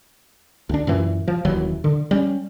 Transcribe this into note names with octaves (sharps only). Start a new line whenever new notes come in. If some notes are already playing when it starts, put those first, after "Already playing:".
D2 D4
F#2 A#2 E3
F3
D#1 D#2 E3 F#3
D3
G3 C#4